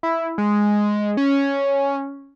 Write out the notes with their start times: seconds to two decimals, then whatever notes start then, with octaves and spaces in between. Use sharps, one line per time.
0.03 E4
0.38 G#3
1.17 C#4